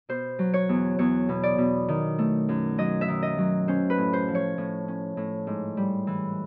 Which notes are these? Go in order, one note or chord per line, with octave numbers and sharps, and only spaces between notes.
B2 C5
F#3
C#5
E2
E2 C#5
B2
D5
B2
D#3
A3
F#2
F#3 D#5
E5
D#3
D#5
F#3
C#4 C5
B4
A2
C5
F3
C#5
A2
C#4
A2
G#2
G3
E3